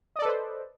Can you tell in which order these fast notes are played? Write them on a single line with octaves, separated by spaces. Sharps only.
D#5 D5 A4 B4 C5